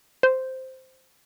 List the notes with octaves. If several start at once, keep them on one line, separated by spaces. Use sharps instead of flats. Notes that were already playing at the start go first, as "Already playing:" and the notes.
C5